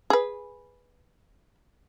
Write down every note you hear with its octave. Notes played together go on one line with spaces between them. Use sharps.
G#4 B4